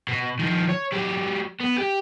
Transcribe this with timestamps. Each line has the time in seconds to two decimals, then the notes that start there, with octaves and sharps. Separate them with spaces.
0.08 B2
0.39 D#3 F3
0.69 C#5
0.92 F#3 G4
1.61 B3
1.78 G4